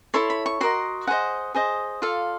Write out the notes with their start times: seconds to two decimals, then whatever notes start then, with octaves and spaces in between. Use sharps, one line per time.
0.14 E4 A4 C#5 C6
0.30 B5
0.46 C#6
0.61 F#4 A#4 D#5 C6
1.07 G#4 C5 D#5 F#5
1.54 G#4 C5 D#5
2.02 F4 A4 D5 F5